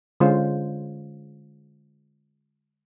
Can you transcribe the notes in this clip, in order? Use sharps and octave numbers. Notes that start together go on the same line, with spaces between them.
D3 G#3 C#4 F4 C5